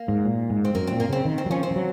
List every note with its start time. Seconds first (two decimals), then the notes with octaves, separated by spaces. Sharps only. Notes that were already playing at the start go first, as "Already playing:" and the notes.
Already playing: A#3
0.08 G#2
0.25 A#2
0.50 G#2
0.65 C4
0.75 F#2 A#3
0.87 A#2 C4
1.00 A#3
1.09 C#3 C4
1.25 D#3
1.38 C4
1.46 F#3
1.50 F3 C#4
1.63 C4
1.71 F3
1.76 F#3